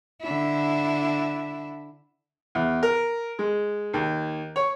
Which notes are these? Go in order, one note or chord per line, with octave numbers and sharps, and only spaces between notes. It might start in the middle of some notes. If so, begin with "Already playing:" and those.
D3 E4
E2
A#4
G#3
D#2
C#5